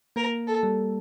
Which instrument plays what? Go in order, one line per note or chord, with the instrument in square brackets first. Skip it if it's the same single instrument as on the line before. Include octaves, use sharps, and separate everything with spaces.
[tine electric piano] A#3 [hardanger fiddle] A#4
[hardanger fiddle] A4
[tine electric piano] G3